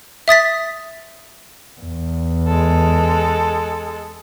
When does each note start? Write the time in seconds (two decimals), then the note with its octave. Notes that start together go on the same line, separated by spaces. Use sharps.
0.28 E5 D#6 A6 B6
1.81 E2
2.47 G#3 A4